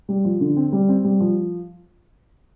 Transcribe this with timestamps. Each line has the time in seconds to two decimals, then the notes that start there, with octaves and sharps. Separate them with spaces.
0.09 G3
0.25 F3
0.41 D3
0.56 C4
0.72 G3
0.89 C4
1.04 G3
1.20 F3